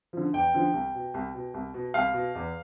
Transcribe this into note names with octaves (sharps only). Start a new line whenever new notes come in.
D3 F3
E2 G5
D3 F3
C2
B2
C2
B2
C2
B2
C2 F5
B2
E2